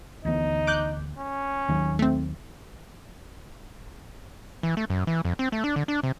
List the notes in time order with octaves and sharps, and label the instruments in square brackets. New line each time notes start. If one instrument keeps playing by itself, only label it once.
[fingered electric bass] D2 E3 B3 [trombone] D#4
[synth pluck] D6 F#6 G6
[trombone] C#4
[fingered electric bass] D#2 D#3 F#3
[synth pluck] A3 C4
[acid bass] E3
A3
F#2
E3
F2
C4
A3
D4
D3
D4
C3